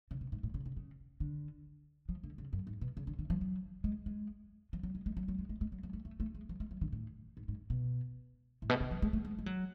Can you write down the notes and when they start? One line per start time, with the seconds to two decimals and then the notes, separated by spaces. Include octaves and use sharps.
0.11 C#3
0.21 B2
0.32 G#2
0.43 A2
0.54 C#3
0.66 C#3
0.77 C#3
1.20 D3
2.09 F3
2.23 D3
2.38 C#3
2.53 F#2
2.67 G#2
2.81 B2
2.97 C#3
3.07 D3
3.19 D3
3.30 F3
3.41 F#3
3.84 G#3
4.06 G#3
4.73 F3
4.83 F#3
4.95 G#3
5.06 G#3
5.17 F#3
5.28 F#3
5.39 G#3
5.49 G#3
5.61 G#3
5.72 F#3
5.83 F#3
5.93 A3
6.05 A3
6.20 A3
6.35 G#3
6.49 F3
6.60 G#3
6.71 F#3
6.81 D3
6.92 A2
7.37 G#2
7.48 G#2
7.70 B2
8.62 A2
8.69 B2
8.80 C#3
8.91 F3
9.02 G#3
9.13 A3
9.25 G#3
9.39 G#3
9.46 F#3